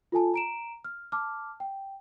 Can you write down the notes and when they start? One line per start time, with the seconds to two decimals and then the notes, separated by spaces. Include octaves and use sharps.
0.12 F4 A4 G#5 A5
0.34 A#5 D7 E7
0.84 F6
1.12 A5 D6 F6
1.60 G5